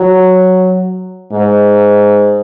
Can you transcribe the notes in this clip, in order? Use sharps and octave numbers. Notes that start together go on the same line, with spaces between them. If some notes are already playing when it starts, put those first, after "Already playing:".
Already playing: F#3
G#2